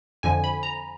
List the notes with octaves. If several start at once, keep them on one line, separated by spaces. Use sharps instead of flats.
F2 D3 F3 G#5
B5
A#5